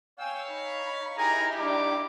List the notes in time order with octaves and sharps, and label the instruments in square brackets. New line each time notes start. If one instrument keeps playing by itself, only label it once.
[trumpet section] C#5 F5 [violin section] G5 G#5 E6
[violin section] D#4 B5
[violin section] D#4 E4 G4 [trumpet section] G#4 A#4 G#5 [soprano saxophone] A#5
[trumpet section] G3 A#3 D6 [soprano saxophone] D4